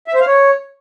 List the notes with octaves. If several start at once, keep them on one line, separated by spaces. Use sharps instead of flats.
E5
C5
F5
C#5